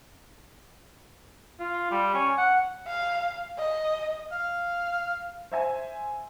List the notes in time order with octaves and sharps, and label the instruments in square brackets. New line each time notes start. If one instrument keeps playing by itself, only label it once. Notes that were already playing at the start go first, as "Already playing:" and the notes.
[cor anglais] F4
G3
C#4
F#5
[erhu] F5
D#5
[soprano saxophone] F5
[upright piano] C5 E5 G#5